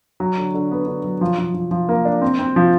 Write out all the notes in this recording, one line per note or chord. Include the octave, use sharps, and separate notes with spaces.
F#3
D3
D3
B3
D3
F#3
F3
F3
F3
F3
A#3
D4
C4
C4
F3